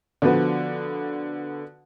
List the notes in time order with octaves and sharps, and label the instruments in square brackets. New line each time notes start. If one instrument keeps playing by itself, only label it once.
[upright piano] D3 F3 B3 F#4 B4